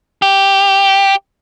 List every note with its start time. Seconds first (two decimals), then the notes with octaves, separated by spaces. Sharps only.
0.22 G4